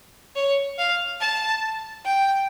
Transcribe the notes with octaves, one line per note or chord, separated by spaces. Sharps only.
C#5
F5
A5
G5